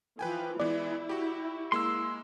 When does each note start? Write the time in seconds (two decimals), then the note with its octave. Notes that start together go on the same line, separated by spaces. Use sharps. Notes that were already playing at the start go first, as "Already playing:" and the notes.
0.19 E3 F3 B4 G5 G#5
0.60 E3 G#3 B3 E4 D5
1.09 F#4 G4
1.72 G#3 A#3 C6 E6